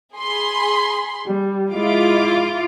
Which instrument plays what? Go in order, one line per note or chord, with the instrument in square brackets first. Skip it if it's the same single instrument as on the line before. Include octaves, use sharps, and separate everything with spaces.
[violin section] G#4 B5 C6
[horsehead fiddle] G3
[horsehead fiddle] G#3 [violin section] E4 D6 [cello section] F4